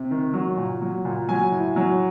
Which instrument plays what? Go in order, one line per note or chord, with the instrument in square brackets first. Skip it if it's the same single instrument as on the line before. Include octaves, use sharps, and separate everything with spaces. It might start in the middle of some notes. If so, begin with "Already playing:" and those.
Already playing: [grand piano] C3
D#3
F#3
A#2
F#3
A#2
F#3 G#5
A2
F#3